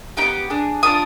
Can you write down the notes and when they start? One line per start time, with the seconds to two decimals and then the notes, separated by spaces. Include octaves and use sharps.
0.17 D#4 G4 D6
0.21 B3
0.50 D4 G#4
0.83 D4 F4 G#4 D#6